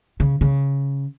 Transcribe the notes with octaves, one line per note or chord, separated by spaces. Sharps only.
C#3
C#3